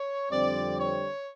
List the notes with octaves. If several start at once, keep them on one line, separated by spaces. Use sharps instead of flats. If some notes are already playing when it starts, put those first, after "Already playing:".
Already playing: C#5
F2 D3 G3 C4 D5
C#5